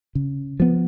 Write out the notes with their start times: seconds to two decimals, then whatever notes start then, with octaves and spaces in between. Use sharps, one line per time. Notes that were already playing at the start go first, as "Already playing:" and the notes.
0.15 C#3
0.60 F3 B3